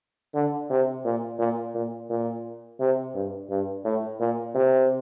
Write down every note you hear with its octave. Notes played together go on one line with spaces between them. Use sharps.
D3
C3
A#2
A#2
A#2
A#2
C3
G2
G2
A2
A#2
C3